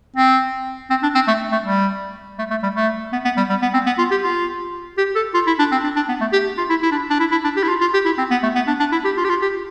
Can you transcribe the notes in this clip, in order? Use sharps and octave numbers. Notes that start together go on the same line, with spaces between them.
C4
C4
D4
C4
A3
A3
G3
A3
A3
G3
A3
B3
B3
G3
G3
B3
C4
B3
F4
G4
F4
G4
A4
F4
E4
D4
C4
D4
D4
B3
A3
G4
F4
E4
E4
D4
D4
E4
E4
D4
G4
E4
F4
F4
G4
E4
C4
B3
A3
B3
D4
D4
E4
G4
F4
G4
F4
G4